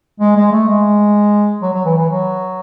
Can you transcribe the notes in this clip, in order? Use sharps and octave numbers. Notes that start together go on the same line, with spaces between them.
G#3
G#3
A3
G#3
F#3
F#3
E3
E3
F#3